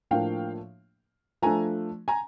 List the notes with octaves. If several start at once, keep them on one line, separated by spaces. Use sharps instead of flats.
A2 F3 A#3 D4 F5 G5
F3 A3 D4 G#5 A#5
G#5 A#5